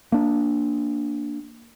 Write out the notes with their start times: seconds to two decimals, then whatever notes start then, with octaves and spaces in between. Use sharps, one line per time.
0.12 A#3 D4